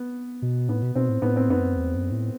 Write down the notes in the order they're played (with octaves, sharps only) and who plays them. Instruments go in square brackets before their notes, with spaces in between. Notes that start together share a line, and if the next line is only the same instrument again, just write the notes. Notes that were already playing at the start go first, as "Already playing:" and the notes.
Already playing: [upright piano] B3
[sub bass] B2
[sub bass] A2 [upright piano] B3
[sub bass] B2
[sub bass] B2 [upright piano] C4
[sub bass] A2
[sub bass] A2 [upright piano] B3
[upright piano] C4
[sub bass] F#2 [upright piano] B3
[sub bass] E2
F#2
A2